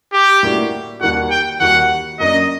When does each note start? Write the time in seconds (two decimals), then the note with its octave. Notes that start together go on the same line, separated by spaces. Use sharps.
0.13 G4
0.43 A2 G3 A#3 D4 F#4
1.01 D#2 D#3 G3 A#3 F#4 F#5
1.31 G5
1.60 D#2 D#3 G3 A#3 F#4 F#5
2.20 F#2 F#3 A#3 D4 D#5